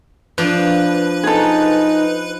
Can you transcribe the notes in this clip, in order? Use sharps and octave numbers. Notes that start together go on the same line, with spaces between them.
F3 D4 B4
D#4 G#4 A4